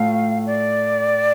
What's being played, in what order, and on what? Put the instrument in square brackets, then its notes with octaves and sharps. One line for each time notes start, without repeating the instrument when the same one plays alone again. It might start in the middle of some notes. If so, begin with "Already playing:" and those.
Already playing: [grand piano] A2 A3 F4 [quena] F5
[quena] D5